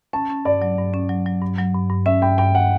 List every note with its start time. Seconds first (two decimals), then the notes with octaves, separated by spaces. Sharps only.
0.13 C#4 A5
0.30 C#4
0.45 G2 D5
0.62 F#3
0.78 G2
0.94 C#4
1.09 F#3
1.26 F#3
1.42 G2
1.58 F#3
1.75 G2
1.90 G2
2.06 C#4 E5
2.22 G2 G5
2.38 G2 G5
2.55 F#5